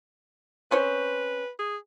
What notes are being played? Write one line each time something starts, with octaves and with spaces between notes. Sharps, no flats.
C4 C#4 B4 C5
G#4